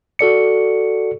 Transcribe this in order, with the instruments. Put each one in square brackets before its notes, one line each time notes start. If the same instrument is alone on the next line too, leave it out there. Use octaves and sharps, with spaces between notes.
[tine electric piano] F#4 A4 D5 C#7